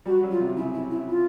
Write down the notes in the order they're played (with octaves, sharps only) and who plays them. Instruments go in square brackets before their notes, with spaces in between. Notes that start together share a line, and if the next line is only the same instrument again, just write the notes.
[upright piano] G3 [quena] F#4
[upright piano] F#3
[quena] F4
[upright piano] C3
[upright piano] C#3 [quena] E4
[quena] E4
E4
F4